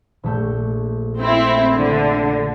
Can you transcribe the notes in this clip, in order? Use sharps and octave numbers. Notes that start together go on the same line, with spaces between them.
A#1 A3 G6
C4 E4
D3